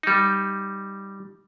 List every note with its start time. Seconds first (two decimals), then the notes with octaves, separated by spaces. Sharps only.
0.03 G3 D#4